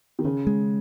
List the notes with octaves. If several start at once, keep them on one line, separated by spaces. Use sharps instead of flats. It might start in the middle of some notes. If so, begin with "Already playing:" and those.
D#3
C#3 C#4
G#3